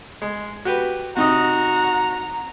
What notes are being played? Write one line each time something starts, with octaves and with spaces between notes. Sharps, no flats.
G#3
F#4 G4 B4
C3 D#4 F#4 A#5 D#6